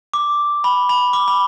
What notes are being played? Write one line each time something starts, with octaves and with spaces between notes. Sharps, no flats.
D6
B5
B5
D6
B5